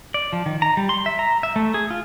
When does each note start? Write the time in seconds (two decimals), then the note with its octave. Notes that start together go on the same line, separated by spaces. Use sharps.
0.14 D5
0.33 F3
0.46 D#3
0.62 A#5
0.77 G3
0.89 C6
1.06 E5
1.19 A#5
1.43 E5
1.56 A3
1.74 G#4
1.91 F4